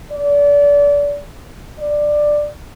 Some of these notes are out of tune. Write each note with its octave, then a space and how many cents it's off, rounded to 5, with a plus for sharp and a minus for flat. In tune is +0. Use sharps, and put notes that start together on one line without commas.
D5 -30
D5 +10